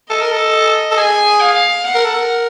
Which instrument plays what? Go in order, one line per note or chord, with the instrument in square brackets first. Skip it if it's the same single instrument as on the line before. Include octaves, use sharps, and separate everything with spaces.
[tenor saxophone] A4 [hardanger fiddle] D#5
[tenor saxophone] A#4
A4
A4
[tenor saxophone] G#4 [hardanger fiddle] G#5
[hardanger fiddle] F5
F#5
[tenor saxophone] A#4
A4
A#4